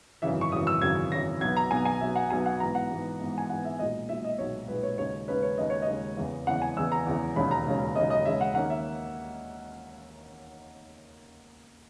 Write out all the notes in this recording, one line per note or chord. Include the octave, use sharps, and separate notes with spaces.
G#1 F#2 C#3 E3 E5
C#6
G#1 F#2 C#3 E3 D#6
E6
G#1 F#2 C#3 E3 G#6
G#1 F#2 C#3 E3 A#6
B1 B2 F#3 B3 G#6
A#5
B1 B2 F#3 B3 G#5
G#5
B1 B2 F#3 B3 E5
F#5
B1 B2 F#3 B3 G#5
F#5
G#2 E3 B3 A#5
F#5
G#2 E3 B3
G#2 E3 B3
G#5
G#2 E3 B3 F#5
E5
B1 A#2 G#3 D#5
B1 A#2 G#3 E5
D#5
B1 A#2 G#3 C#5
B1 A#2 G#3 B4
C#5
D#2 C#3 G#3 C#4 C#5
D#2 C#3 G#3 C#4 B4
C#5
D#2 C#3 G#3 C#4 D#5
C#5
D#5
D#2 C#3 G#3 C#4
E2 C#3 E3
E2 C#3 E3 F#5
G#5
E2 C#3 E3 E6
A#5
E2 C#3 E3
E1 D#2 C#3 G#3 C#4 B5
A#5
E1 D#2 C#3 G#3 C#4
E1 D#2 C#3 G#3 C#4 D#5
D#5
E1 D#2 C#3 G#3 C#4 E5
F#5
D#2 D#3 A#3 C#4 F#5
E5